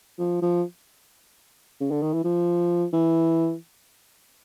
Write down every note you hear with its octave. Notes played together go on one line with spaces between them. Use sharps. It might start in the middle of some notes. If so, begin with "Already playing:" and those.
F3
F3
C#3
D3
D#3
E3
F3
E3